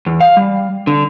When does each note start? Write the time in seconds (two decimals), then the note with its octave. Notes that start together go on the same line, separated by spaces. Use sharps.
0.07 E2
0.21 F5
0.37 G3
0.87 D3